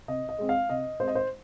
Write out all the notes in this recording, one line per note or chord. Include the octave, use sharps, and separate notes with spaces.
C3 D#5
D#5
G#3 C4
F5
C3 D#5
G#3 C4 C5
D#5
C5